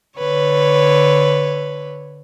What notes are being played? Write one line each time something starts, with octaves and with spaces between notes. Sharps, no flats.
D3 B4 C#5